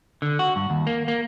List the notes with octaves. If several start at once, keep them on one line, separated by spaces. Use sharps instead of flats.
D3
F#4
G2
D#2
A#3
A#3